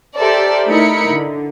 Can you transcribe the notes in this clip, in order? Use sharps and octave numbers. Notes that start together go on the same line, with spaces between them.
G4 A4 A#4 C5 D5 E5
A3 D#4 E4 A#4 B5 C#7
D3